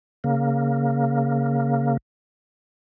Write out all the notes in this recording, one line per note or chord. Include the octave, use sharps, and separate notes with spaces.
C#3 A#3